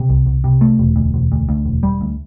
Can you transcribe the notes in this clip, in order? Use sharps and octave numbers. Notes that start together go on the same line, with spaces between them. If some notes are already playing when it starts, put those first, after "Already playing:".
Already playing: C3
C2
C2
C3
A3
E1
D2
E1
D2
D2
E1
G3
D2